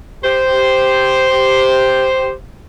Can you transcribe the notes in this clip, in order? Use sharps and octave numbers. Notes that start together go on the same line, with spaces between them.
G4 C5